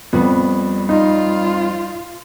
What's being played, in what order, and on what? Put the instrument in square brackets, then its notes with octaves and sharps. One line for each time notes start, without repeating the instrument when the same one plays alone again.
[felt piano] F2 [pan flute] G3 [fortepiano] B3
[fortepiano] D#4 [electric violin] F4